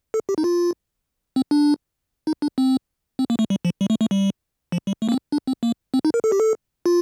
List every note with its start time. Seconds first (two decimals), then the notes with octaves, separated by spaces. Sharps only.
0.14 A4
0.29 G4
0.38 D#4
0.44 F4
1.36 C4
1.51 D4
2.27 D#4
2.42 D4
2.58 C4
3.19 C4
3.30 A#3
3.39 A3
3.50 G3
3.65 F3
3.81 G3
3.90 A3
4.01 A3
4.11 G3
4.72 F3
4.87 G3
5.02 A3
5.09 A#3
5.12 C4
5.32 D4
5.47 C4
5.63 A#3
5.94 C4
6.05 D#4
6.14 A#4
6.24 A4
6.32 G4
6.40 A4
6.86 F4